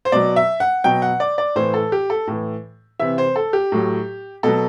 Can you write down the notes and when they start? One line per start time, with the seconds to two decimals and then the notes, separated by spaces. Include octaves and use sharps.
0.05 C5
0.12 B2 F#3 D5
0.36 E5
0.60 F#5
0.84 B2 F#3 G5
1.02 F#5
1.20 D5
1.38 D5
1.56 A2 E3 C5
1.74 A4
1.92 G4
2.10 A4
2.28 A2 E3
3.00 C3 E3 E5
3.18 C5
3.36 A4
3.53 G4
3.72 A2 F#3
4.43 B2 F#3 A4